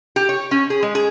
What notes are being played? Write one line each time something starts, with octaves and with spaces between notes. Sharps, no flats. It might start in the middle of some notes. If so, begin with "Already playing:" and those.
G4
C#5
C#4
G#4
G#3
G#4